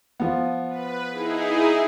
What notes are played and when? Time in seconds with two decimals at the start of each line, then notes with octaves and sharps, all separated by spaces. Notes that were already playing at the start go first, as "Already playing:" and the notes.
0.20 F3 B3
0.69 B4
1.10 D#4 E4 G#4